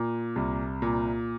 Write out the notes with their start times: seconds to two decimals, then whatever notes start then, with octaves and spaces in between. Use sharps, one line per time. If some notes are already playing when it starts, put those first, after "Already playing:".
Already playing: A#2
0.36 C2
0.82 A#2